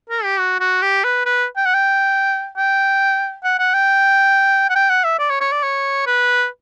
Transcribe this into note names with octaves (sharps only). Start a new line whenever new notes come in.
A#4
G4
F#4
F#4
G4
B4
B4
G5
F#5
G5
G5
F#5
F#5
G5
F#5
G5
F#5
E5
D5
C#5
C#5
D5
C#5
B4